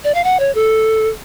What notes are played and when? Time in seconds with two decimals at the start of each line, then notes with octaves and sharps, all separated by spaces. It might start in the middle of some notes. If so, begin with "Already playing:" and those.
0.04 D5
0.14 F5
0.24 F#5
0.40 C#5
0.55 A4